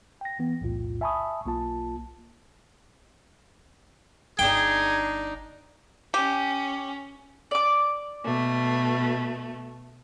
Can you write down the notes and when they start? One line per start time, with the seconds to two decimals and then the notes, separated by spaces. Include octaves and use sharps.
0.21 G5 A#6
0.39 E3 B3
0.61 B1 E2 A2 F4
1.01 E5 G#5 A5 B5 C#6 D#6
1.45 B1 A#3 F4 A5
4.39 G1 D4 D#4 G#4 G5
6.14 C#4 G4
7.51 D5 D6
8.24 B2 A3